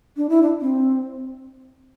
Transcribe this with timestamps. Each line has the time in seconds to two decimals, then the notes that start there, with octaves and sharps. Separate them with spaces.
0.17 D4
0.29 E4
0.42 D4
0.61 C4